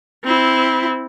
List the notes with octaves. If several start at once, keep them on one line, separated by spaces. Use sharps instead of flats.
C4 E4